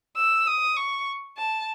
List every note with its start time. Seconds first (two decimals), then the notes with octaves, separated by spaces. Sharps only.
0.16 E6
0.47 D#6
0.77 C#6
1.38 A5